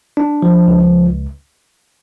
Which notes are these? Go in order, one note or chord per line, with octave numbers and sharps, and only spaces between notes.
D4
F3
C#2